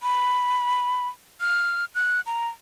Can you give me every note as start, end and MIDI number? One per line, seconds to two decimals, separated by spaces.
0.03 1.08 83
1.41 1.85 89
1.95 2.21 90
2.26 2.49 82